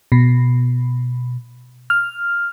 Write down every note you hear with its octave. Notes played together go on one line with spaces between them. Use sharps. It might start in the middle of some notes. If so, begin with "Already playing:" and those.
B2
F6